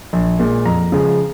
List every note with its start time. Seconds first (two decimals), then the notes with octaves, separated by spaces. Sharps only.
0.13 A#1
0.39 A#2 G#3
0.66 F2 A#5
0.92 C#3 F3 G#3